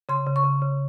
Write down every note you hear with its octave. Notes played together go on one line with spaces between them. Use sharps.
C#3 C6
C#3
C#6
C#3
C#3